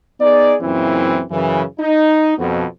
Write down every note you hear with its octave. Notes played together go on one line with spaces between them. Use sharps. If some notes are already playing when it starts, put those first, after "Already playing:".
B3 D#4 G#4 D5
F#2 A#2 C#3 E3 C4 E4
F#2 C#3 E3
D#4
F2 B2